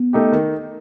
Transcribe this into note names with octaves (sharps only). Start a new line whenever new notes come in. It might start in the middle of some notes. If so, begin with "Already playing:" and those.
Already playing: B3
A3 D#4 G4
D#3